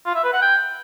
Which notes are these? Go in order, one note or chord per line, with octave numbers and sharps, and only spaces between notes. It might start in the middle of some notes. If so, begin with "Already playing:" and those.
F4
E5
B4
F#5
G5